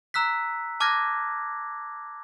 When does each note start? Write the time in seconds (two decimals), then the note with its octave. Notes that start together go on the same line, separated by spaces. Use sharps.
0.14 A#5 E6 F#6 B6
0.80 A5 D6 F6 F#6 G#6 A#6